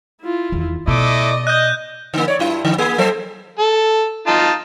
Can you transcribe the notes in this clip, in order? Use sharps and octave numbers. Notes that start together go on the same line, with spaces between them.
E4 F4
E2 D#3
B2 A3 E4 D5 D#5 D6
D#5 F#6 G6
D3 A#3
C#5 D5
G2 E4
D3
A#3 G#4
F#3 A4 C5
A4
D#4 F4 A5